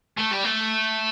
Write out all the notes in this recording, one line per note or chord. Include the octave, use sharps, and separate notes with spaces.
A3
G3
A3